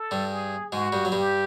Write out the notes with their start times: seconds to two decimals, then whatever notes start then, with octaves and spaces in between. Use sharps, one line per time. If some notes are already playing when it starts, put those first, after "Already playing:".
Already playing: A4
0.11 G2 G3
0.32 G#4
0.72 G#2 G#3 F#4
0.92 G2 G3
1.05 F#3
1.12 G2 G3 G4